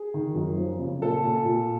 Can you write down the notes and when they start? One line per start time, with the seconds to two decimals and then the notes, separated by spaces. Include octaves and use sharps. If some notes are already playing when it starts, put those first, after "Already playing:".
Already playing: G#4
0.14 D#3
0.35 F#2
0.57 F3
0.79 C#3
1.01 A#2 A4
1.24 A#2
1.45 A#2